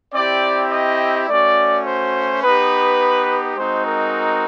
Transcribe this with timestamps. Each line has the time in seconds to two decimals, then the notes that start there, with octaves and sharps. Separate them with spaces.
0.14 C4 E4 G4 D5
0.71 D#5
1.28 A3 C#4 F#4 D5
1.85 C5
2.43 B3 D#4 G4 B4
3.57 G#3 C4 D#4 F#4 C5
3.86 A#4